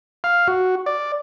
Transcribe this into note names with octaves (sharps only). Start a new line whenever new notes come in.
F5
F#4
D5